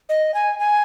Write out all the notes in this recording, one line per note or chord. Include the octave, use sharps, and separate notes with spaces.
D#5
G#5
G#5